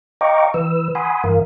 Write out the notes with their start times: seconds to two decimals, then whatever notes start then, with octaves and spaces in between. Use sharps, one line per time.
0.21 D#5 F5 G5 A#5 C#6 D6
0.54 E3 B4 E6
0.95 F#5 G#5 B5 C6 D#6
1.24 G2 E3 A#4 F5